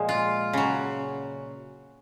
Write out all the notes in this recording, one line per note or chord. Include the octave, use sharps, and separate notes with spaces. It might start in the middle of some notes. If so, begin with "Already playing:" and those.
Already playing: A#2 F3 G#3
F4
C#3 F#3